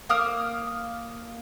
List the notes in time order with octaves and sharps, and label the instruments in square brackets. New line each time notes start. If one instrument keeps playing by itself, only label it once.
[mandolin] A#3 D#6 F6